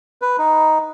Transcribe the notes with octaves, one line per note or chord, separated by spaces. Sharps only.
B4
D#4